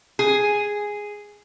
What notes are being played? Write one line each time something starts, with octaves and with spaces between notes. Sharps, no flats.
G#4